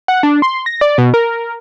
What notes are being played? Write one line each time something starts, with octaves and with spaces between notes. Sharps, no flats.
F#5
D4
C6
A#6
D5
B2
A#4